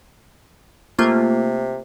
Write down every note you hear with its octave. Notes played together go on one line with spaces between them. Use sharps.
C3 A3 A#3 F4